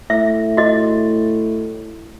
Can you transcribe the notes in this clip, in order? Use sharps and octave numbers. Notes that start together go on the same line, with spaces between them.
A2 E5
F#4 D#5